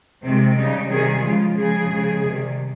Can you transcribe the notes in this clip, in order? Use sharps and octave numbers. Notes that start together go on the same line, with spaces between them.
C3 D#3 G#3 C4
C#3 G3 D#4
C3 D#3 G3 G#4
C#3 F3 G#3 F4
C#3 F3 G#3 G#4
C#3 F3 G#3
C3 D#3 G3